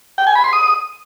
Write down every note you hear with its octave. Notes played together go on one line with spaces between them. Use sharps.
G5
G#5
B5
C6
D#6